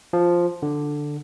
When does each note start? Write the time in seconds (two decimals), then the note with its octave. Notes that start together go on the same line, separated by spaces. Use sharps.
0.13 F3
0.62 D3